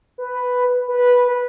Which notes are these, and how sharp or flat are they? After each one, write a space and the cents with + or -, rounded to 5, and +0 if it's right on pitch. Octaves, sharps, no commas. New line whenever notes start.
B4 +5
B4 -10